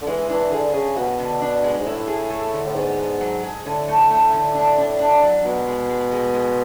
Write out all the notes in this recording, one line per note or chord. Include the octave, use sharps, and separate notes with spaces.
D3
E3 G#3
E3 D4
D3 G#4
C#3 G#4
B2 F#4
D3
D4
G#3
G#2
A2 E4
G#4
A3
D3
A2
G#2 B3
B3
F#3
G#4
A2 D3
A3
A3
D3
D4
D4
D4
F#3
B2 G#3
G#3
G#3
G#3
G#3